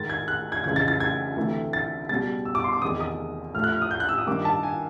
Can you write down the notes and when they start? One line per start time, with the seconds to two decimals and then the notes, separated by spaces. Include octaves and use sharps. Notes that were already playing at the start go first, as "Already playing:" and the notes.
Already playing: G#2 D#3 G#3 A6
0.10 G#6
0.28 F#6
0.52 G#6
0.64 F2 C#3 E3 G#3 G#6
0.76 A6
0.88 A6
1.00 G#6
1.36 D2 C3 E3 A3
1.73 A6
2.09 C#2 B2 G3 A6
2.45 E6
2.55 D6
2.64 C6
2.73 D6
2.82 E2 C3 D#3 G#3 D#6
3.00 D#6
3.54 A2 F3 A3 F6
3.64 F#6
3.72 F6
3.82 D#6
3.91 G6
4.00 F#6
4.09 E6
4.18 D#6
4.27 G2 D#3 G3 A#3 D6
4.45 A5
4.63 G#5